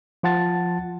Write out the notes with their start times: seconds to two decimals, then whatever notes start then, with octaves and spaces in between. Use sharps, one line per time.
0.23 F3 F4 F#5 A5 A6